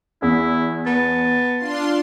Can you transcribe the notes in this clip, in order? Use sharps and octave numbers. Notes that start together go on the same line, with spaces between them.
E2 E4
B3 A5
D4 F4 C6